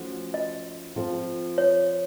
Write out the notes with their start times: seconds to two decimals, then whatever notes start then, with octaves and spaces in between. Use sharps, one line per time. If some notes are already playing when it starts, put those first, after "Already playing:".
Already playing: F3 A3 C#4 F#4
0.34 D#5
0.96 F3 C4 F4 A4
1.58 C#5